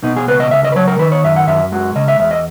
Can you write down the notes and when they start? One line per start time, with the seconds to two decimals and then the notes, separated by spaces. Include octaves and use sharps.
0.03 B2 D#4
0.16 G#4
0.28 C#2 B4
0.40 D#5
0.51 C#2 E5
0.64 D#5
0.72 B4
0.76 F#3 C#5
0.87 A#4
0.99 D#3 B4
1.12 C#5
1.24 F#2 E5
1.36 F#5
1.47 F#2 E5
1.72 G#3 F#4
1.96 C#3 D#5
2.08 E5
2.19 E2 E5
2.31 D#5